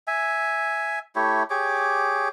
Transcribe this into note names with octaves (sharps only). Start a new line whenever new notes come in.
E5 G#5
A3 E4 G4 C#5
G4 G#4 C#5 D6